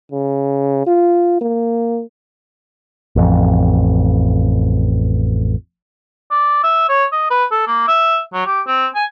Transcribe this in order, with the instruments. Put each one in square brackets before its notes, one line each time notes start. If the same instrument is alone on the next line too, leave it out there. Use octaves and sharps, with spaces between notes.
[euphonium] C#3
F4
A#3
[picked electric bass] A1 F2
[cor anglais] D5
E5
C#5
D#5
B4
A4
A#3
E5
F#3
G4
C4
G#5